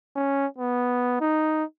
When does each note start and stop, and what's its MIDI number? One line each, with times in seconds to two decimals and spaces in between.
0.16 0.47 61
0.58 1.16 59
1.21 1.64 63